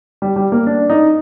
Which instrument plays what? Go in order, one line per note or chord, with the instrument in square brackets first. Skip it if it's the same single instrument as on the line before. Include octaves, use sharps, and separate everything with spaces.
[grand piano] G3
G3
A#3
D4
D#4